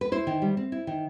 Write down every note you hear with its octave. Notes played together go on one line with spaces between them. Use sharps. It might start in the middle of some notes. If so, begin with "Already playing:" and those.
B4
E4 C5
D#3
G3
C4
E4
D#3